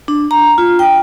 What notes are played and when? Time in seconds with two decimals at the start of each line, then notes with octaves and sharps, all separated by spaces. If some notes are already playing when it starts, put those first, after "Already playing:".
0.08 D4
0.31 A#5
0.58 F4
0.79 G5